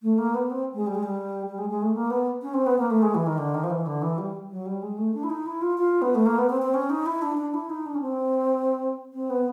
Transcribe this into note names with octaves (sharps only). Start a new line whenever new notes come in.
A3
A#3
B3
C4
G#3
G3
G#3
G3
G3
G#3
G#3
A3
A#3
B3
C#4
C4
B3
A#3
A3
G#3
E3
D#3
D3
D#3
F3
E3
D3
E3
G3
F#3
G3
G#3
A3
D4
E4
D#4
E4
F4
F4
B3
A3
A#3
B3
C4
C4
C#4
D#4
E4
D4
D4
E4
D#4
D4
C#4
C4
C4
B3